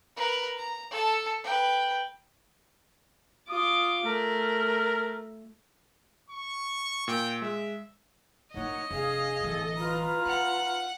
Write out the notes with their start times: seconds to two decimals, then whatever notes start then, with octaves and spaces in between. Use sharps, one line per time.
0.17 A#4 B4
0.57 A#5
0.91 A4 A5
1.44 B4 G5
3.50 F4 D6 D#6
4.06 A3 A#4
6.30 C#6
7.08 A#2 G5
7.42 G#3 E5
8.54 A#1 A#3 D#4 C#5 D#5 F#5
8.91 F1 D4 G#4 F5
9.43 D1 E3 A4
9.78 F4 B4 A#5
10.26 D#4 F#5